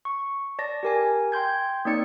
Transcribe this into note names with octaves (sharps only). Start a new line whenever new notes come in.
C#6
D5 A5 A#6
G4 A#4 G#5
G5 C6 G6 G#6
A#3 C4 D#4 D5 C#7